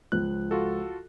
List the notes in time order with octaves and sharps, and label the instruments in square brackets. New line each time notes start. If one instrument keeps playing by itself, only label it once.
[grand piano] C#2 F3 [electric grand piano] F#6
[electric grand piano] F4 F#4 A4